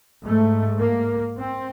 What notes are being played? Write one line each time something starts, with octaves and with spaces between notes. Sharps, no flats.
G#2 A3
A#3
C4